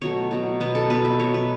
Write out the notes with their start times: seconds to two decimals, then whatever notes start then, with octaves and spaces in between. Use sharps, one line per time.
0.01 B2 F#3 A3 C#5
0.31 B2 F#3 A3
0.60 B2 B3 B4
0.75 A4
0.90 B2 B3 B4
1.05 E5
1.19 B2 F#3 B3 C#5
1.34 B4